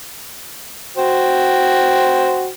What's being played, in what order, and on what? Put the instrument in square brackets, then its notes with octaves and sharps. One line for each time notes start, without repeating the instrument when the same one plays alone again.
[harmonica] F#4 C5 G5